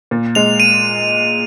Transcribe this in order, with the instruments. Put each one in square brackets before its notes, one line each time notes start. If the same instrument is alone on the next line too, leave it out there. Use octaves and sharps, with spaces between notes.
[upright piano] A#2
[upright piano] G#3 [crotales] F7
[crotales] D#7